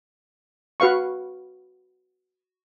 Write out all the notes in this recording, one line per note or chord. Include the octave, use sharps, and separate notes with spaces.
F#4 B4 F5 C#6